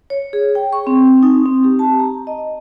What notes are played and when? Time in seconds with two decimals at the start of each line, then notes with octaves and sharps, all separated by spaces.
0.10 C#5
0.33 G#4
0.55 G5
0.73 C#6
0.87 C4
1.23 D#4
1.46 C4
1.64 G4
1.79 A5
1.99 A#5
2.27 D#5